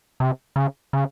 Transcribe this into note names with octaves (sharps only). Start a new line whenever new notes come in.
C3
C#3
C#3